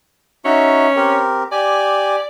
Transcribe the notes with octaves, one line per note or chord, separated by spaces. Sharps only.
C#4 D#4 F#4 E5
C4 G4 A#4
G4 D5 G#5